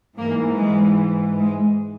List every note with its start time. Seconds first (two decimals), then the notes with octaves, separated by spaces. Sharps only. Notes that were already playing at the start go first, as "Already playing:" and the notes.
0.17 G#2 E3 A#3
0.57 G#3
1.40 G#3